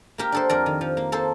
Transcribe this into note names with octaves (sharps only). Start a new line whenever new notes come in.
A#3 G4 A#4
D4 A4 C5
F2 A#4 D5
D#3
F3
A#3
A#3 A4 C5